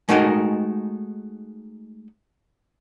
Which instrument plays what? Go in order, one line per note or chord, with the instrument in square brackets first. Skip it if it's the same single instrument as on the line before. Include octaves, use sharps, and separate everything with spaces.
[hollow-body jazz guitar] G#3 A3 D#4 F#4 A#4 D#5